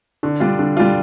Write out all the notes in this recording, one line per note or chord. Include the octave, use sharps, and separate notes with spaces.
D3
G3 D4 F4
D3
G3 D4 F4